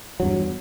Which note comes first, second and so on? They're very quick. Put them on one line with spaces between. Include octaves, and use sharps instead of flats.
F#3 G2 E2